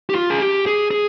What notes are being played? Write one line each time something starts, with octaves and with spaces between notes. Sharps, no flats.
G4
F4
G#4
G4
G#4
G#4